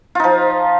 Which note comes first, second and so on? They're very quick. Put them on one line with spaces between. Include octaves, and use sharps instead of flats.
F4 D#4 F3